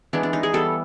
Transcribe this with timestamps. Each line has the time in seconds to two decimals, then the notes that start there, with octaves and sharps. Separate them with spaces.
0.13 E3 G#3 B3 D4
0.23 D4
0.33 D#4
0.43 G#4
0.53 E3 G3 B3 A4